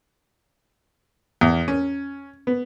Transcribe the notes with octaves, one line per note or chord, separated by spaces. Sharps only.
E2
C#4
B3